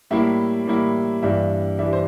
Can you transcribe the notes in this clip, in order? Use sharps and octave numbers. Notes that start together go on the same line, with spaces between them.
A2 G3 A#3 E4 E5
A2 G3 A#3 E4
G2 E3 G3 D4 E5
E3 G3 D4 E5
C5